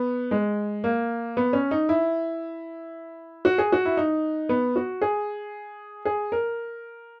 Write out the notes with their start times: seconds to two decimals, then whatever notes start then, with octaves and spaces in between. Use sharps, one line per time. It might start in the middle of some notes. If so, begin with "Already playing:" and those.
Already playing: B3
0.31 G#3
0.84 A#3
1.37 B3
1.53 C#4
1.71 D#4
1.89 E4
3.45 F#4
3.58 G#4
3.72 F#4
3.85 E4
3.97 D#4
4.49 B3
4.76 F#4
5.02 G#4
6.05 G#4
6.32 A#4